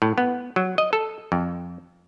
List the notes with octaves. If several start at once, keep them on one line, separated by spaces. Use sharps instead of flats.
A2
B3
F#3
D#5
A4
F2